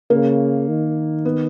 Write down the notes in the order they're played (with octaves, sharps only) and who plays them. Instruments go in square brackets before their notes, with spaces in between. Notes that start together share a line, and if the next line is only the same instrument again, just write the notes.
[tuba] C#3 [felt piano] A#3
[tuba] D#3
[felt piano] B3